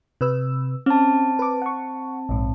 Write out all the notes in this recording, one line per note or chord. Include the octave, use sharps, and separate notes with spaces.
C3 B4 E6
C4 C#4 A5
B4 D6
F#5 C#6
A#1 G#2